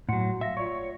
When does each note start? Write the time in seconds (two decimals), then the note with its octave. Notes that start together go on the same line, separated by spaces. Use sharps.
0.08 A2 F#3 F#5 C6 C#7
0.41 E5 F5 A#6
0.57 F4 C#5 D5 C#6